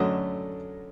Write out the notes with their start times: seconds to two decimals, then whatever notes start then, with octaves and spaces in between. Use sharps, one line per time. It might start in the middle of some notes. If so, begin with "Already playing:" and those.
Already playing: F#2 D3 F#3 A3 D#5